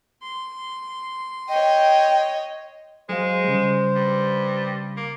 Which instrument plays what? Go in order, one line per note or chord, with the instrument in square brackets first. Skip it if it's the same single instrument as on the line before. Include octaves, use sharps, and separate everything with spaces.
[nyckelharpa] C6
[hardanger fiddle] C#5 D#5 [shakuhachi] G5
[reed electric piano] F#3 G#4 F5 [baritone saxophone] G#3 [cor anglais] C5
[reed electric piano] C#3 G3
[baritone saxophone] G2
A#3